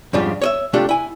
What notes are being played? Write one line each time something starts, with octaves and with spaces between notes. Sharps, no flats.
F2 G#2 C#3 G3 D4 F4
C#5 D#5 E5
C3 A3 D4 F4 G4
E4 G#5